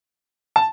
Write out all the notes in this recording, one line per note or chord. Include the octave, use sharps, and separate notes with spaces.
A5